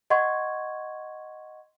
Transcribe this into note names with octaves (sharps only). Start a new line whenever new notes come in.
D#5 F#5 C6 C#6 G#6